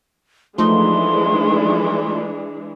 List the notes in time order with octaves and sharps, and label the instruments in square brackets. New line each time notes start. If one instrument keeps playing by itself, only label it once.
[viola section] E3 G#3 D4 [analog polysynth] F3 A3 D#4 [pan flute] C6